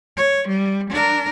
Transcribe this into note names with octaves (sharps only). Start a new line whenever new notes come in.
C#5
G3
D4 A#4